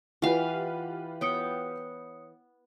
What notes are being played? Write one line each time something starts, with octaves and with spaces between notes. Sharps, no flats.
E3 F4 G4 B4 F5 F#5
B3 C#5 G5 D#6 C#7